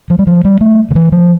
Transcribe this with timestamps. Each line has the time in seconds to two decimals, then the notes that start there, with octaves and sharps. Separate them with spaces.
0.10 F3
0.19 G3
0.27 F3
0.45 G3
0.61 A3
0.91 D3
0.95 E3
1.12 F3